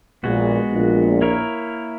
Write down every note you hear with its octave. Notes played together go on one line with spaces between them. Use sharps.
A#1 A#2 G#3 B3 F#4
A#1 A#2
A#3 E4 A#4 C#5